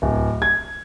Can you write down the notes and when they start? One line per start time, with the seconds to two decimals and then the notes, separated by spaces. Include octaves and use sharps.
0.02 D1
0.42 G#6